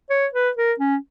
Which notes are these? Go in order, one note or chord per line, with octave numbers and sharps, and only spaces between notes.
C#5
B4
A#4
C#4